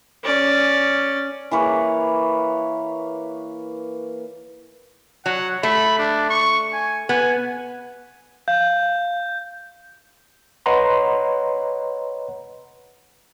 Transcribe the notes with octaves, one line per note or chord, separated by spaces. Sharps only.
C#4 D5
E3 A#3 B4 C#5
F#3 F#5
A3 B5
D4
C#6
G#5
B3 G#5
F5 G6
B4 C#5 D#5 F#5 A#5 C6